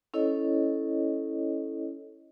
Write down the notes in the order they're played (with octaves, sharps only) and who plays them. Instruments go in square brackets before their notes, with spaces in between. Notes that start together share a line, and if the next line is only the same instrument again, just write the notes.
[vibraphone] C#4 E4 A4 C#5 D#5